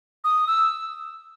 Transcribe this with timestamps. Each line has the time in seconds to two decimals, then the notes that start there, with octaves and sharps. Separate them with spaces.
0.24 D#6
0.47 E6